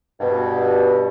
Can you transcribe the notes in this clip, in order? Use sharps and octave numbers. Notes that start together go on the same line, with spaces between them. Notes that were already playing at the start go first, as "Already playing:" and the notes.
G2 B2